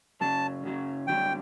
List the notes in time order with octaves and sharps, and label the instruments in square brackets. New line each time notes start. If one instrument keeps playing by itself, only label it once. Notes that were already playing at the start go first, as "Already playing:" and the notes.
[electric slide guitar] F#2 C#3 F#3 [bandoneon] A5
[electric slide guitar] F#2 C#3 F#3
[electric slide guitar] G2 D3 F#3 [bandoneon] G5